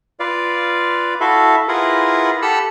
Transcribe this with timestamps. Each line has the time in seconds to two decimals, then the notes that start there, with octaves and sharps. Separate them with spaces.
0.20 F4 B4 D5 F5
1.21 E4 F#4 A4 E5 F5
1.68 E4 F4 G#4 A#4 B4 F#5
2.42 G4 A4 F#5 B5 E6 F#6